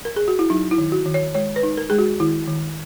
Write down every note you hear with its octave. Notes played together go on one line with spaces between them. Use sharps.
A#4
G#4
F#4
E4
F#3 D#4
E4
D#3
F#4
D#3
C#5
G#3 C#5
B4
D#4
A#4
G#3 G#4
F#4
D#3 E4
D#3